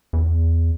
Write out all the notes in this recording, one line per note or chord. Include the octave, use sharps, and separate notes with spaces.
E2